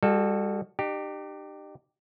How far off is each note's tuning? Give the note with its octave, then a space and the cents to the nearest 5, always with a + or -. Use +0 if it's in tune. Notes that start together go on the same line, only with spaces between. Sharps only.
G3 +40 F#4 +0 A4 +0
D#4 -45 G4 +0